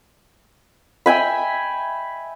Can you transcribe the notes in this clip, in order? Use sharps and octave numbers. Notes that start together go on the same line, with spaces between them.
E5 G5 G#5 B5